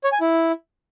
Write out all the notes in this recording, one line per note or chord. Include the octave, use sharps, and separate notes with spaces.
C#5
G#5
E4